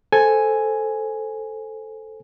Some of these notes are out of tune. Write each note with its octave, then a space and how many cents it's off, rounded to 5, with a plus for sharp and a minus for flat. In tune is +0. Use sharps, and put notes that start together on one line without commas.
A4 +0 C5 +0 G#5 +0